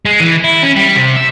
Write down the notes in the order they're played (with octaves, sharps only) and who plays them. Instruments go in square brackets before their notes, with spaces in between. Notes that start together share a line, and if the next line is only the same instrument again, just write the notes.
[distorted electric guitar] G#3
E3
E4
C#4
G3
C3
E5